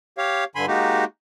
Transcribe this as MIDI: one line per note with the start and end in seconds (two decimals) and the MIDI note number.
0.18 0.44 67
0.18 0.44 73
0.18 0.44 77
0.56 0.66 43
0.56 0.66 50
0.56 0.66 80
0.56 0.66 83
0.56 0.66 84
0.67 1.05 56
0.67 1.05 58
0.67 1.05 63
0.67 1.05 66
0.67 1.05 67